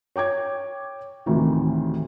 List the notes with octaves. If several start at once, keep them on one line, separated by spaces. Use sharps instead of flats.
C#5 G5 D6 G#6
D2 A2 C3 D#3 E3